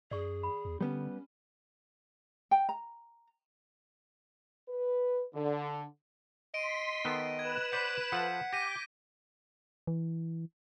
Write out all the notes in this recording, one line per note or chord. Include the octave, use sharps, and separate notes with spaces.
F#2 G#4 D5 C#6
B5
E2
D3 G3 B3 C#4
G5
A#5
B4
D3
D#5 C6 B6 D7 D#7
D#3 B3 A4
B4 F#6 G#6 E7
C5 D5 F#5 G6 B6
F3 A4 F#5
G4 D6 G6 A#6 B6 D#7
E3